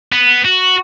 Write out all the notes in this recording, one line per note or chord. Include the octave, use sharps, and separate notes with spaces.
B3
F#4